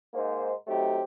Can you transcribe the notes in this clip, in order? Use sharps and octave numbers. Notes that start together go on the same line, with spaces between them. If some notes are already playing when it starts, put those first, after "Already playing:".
G#2 A#3 D#4 C5
F#3 A3 C4 D#4 G4